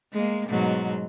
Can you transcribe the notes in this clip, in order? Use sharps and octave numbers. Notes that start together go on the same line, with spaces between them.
G#3 A#3
G#2 B2 F#3